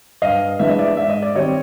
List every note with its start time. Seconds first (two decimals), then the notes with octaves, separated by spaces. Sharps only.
0.22 G2 D#5 F5
0.59 E3 G#3 B3 D4 E5
0.70 D#5
0.79 D5 E5
0.97 G#2 E5
1.10 D#5
1.22 D5
1.34 D#3 G3 C4 C#5 D#5